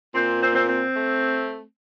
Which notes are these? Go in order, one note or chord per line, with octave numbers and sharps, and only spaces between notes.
A#2 C4
C4
C4
C4
A3